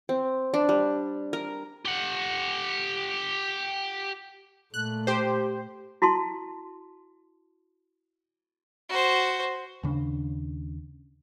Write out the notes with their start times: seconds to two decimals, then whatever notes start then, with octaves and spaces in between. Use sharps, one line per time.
0.09 C4
0.54 D4
0.69 G3
1.33 A#4
1.86 G4 F#5
4.74 A#2 A3 F#6
5.07 G4 C5
6.02 E4 F#4 A5 C6
8.89 F#4 C5
9.83 D#2 C#3 D4